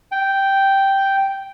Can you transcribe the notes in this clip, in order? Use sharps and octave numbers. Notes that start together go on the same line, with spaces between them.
G5